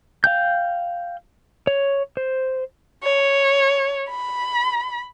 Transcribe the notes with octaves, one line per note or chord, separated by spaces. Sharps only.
F5 G5 G6
C#5
C5
C#5
B5